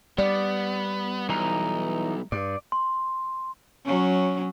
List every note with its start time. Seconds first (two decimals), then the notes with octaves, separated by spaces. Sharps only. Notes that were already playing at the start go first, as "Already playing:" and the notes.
0.18 G3 B3 D5
1.29 B1 E3 D#4 A#5
2.32 G2 D5
2.72 C6
3.85 F#3 C#4